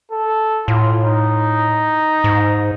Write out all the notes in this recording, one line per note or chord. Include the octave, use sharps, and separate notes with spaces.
A4
A2 F4
D#4
G#2